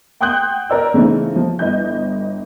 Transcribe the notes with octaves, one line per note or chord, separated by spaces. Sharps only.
F#5 G5 C6 D#6 F#6 G6
A#4 D5 E6
C#3 E3 A3 C4 D#4
F3
G1 E4 D#5 G6